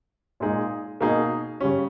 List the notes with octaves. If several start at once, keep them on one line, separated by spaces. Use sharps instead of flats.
A#2 G#3 D#4 G#4
B2 A#3 D#4 G#4
C#3 G3 C#4